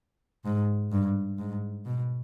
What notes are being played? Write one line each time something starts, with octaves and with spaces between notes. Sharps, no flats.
G#2
G2
G#2
B2